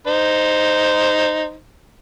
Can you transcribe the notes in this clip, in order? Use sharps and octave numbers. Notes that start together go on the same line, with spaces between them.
D#4 C5